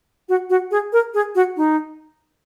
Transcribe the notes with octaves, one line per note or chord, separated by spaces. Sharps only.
F#4
F#4
G#4
A#4
G#4
F#4
D#4